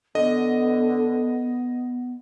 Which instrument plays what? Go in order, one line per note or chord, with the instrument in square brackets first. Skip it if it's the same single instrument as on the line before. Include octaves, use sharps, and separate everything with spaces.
[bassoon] D3 [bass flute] B3 [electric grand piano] D#5